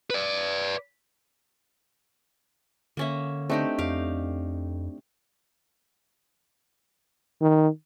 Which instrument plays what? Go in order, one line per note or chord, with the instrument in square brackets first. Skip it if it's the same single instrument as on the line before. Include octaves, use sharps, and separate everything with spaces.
[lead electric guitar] B4 D5
[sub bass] D3 [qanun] A#3 C#4 E5
[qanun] A3 D#4 G4 [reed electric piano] C4 D4 D5
[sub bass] F2 [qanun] G4 F5
[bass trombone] D#3